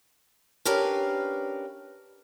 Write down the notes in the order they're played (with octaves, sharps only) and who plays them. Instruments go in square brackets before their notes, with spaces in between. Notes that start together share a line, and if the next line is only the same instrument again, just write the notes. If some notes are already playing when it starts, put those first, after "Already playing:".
[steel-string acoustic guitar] C#4 D4 G4 A#4 B4 F5